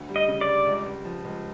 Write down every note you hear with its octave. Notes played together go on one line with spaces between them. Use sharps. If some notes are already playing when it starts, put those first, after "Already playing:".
Already playing: D2
G3
D#5
C#3
D5
G3
C#2
C#2
F3
C#2